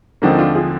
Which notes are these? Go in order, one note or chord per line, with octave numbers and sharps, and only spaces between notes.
D#2 D3 F3 G#3 A#3 C4 D4
D4 F4
F4 G#4